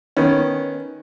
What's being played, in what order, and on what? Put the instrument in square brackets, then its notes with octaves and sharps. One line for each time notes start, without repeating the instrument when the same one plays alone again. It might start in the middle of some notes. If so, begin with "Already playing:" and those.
[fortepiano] D#3 B3 C#4